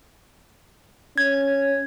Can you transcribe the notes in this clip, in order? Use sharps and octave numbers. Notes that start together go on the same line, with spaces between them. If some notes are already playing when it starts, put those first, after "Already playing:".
C#4 G#6